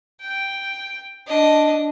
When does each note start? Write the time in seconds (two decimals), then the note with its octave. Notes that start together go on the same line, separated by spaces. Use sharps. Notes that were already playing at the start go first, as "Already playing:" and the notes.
0.21 G5
1.27 D4 D#5